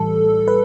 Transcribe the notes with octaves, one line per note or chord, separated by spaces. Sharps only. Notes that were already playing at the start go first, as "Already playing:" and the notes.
Already playing: A2 E3 G3 A4
B4